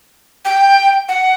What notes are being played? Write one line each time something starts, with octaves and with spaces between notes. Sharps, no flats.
G5
F#5